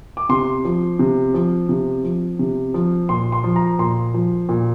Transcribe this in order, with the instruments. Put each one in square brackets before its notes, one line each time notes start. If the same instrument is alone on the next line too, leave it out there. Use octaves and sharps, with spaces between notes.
[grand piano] D6
C3 C6
F3
C3
F3
C3
F3
C3
F3
A#2 C6
C6
F3
A#5
A#2 C6
F3
A#2